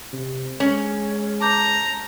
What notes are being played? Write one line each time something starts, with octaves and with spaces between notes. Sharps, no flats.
C3
G#3 C#4
A5 A#5 D6 G6